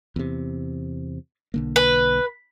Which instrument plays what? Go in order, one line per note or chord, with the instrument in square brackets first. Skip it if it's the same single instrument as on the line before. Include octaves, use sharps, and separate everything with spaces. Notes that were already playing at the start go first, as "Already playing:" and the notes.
[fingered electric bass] E2 C3
B1 D3 A#3
[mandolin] B4